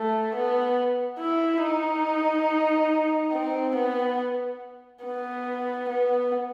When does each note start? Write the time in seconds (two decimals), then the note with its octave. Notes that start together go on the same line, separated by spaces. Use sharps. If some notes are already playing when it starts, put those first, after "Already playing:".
Already playing: A3
0.35 B3
1.19 E4
1.62 D#4
3.34 C4
3.76 B3
5.04 B3
5.89 B3